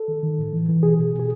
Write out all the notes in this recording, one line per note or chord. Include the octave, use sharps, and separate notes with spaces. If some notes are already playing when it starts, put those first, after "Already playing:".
Already playing: A4
D#3
D#3
A2
E3
E3
B2 G#4
B2
B2
G#4